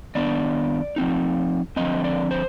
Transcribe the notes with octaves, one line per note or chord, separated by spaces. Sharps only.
D#3 B3 D4 D5
F3 C4 D#4
D3 F3 C4 D#5
D5
C5